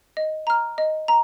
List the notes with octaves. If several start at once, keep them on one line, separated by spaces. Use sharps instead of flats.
D#5
A#5 F6
D#5
A#5